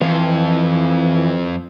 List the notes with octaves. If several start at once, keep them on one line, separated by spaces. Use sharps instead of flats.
F2 E3 F4